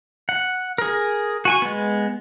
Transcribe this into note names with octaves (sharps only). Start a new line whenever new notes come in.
F#5
G#4 A#4
F#4 G#5 C#6
G#3 B3